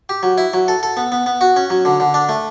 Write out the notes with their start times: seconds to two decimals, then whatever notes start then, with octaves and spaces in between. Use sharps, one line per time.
0.09 G4
0.23 F#3
0.38 E4
0.53 F#3
0.68 A4
0.83 A4
0.97 B3
1.12 B3
1.26 B3
1.41 F#4
1.56 C#4
1.70 F#3
1.85 D3
2.00 D3
2.14 D4
2.29 A3